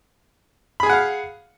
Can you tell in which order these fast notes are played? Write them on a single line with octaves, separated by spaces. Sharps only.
B5 G#4 G#5 F#5 F5